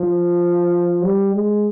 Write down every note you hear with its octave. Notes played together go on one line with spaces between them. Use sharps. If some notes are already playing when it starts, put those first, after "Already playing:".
Already playing: F3
G3
G#3